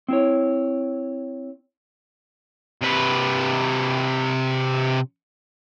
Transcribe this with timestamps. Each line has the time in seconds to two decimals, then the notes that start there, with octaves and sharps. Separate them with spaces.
0.08 C4 E4 C#5
2.81 C3 B4